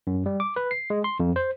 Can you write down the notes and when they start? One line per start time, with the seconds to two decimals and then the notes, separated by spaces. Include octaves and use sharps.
0.07 F#2
0.26 G3
0.40 D6
0.56 B4
0.71 C7
0.90 G#3
1.04 C6
1.20 F2
1.36 C5